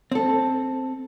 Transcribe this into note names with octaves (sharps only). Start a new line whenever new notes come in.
C4 A4